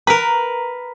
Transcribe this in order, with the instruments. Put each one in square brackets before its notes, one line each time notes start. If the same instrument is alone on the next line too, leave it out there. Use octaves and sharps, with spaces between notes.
[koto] A#4 B4 [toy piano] A#5